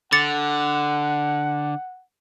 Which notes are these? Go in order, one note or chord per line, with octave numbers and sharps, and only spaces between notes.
D3 F#5 D6 A6 C#7